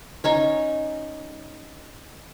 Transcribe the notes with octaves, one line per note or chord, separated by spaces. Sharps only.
C#4 D#4 C#5